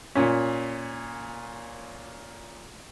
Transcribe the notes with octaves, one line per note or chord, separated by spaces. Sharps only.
A#2 C#4